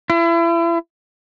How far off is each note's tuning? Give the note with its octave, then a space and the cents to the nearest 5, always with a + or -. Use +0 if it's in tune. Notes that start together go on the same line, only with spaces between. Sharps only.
E4 +35